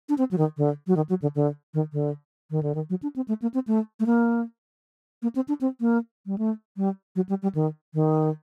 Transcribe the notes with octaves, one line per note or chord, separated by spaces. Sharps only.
D4
C4
F#3
D#3
D3
F#3
D#3
F#3
D3
D3
D#3
D3
D#3
D3
D#3
F#3
D4
C4
A3
A#3
C4
A3
A3
A#3
A#3
C4
D4
C4
A#3
G3
A3
G3
F#3
G3
G3
D#3
D#3